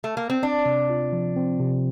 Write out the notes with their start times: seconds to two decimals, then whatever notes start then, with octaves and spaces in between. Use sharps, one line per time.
0.04 A3
0.17 A#3
0.30 C4
0.43 C4 D4
0.66 C3
0.90 F4
1.13 F3
1.36 C4
1.60 C3